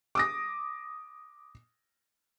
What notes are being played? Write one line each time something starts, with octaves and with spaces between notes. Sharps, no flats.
D6 D#6 A#6